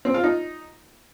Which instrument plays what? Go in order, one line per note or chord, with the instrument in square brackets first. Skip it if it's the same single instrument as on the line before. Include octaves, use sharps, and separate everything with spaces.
[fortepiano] C4
F4
D#4